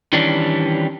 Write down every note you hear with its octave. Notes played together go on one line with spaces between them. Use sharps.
D#3 E3 G3 C#4 D4